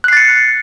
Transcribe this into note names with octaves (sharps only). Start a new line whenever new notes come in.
F#6 A6 C7 C#7